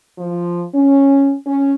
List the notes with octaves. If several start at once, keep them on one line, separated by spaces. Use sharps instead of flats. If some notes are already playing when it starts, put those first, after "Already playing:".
F3
C#4
C#4